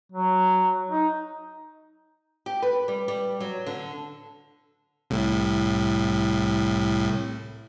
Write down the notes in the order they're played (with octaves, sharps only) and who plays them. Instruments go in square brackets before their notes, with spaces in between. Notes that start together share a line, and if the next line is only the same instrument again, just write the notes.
[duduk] F#3
D#4
[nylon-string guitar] G4
B4
G3
G3
F#3
D3
[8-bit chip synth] C2 A2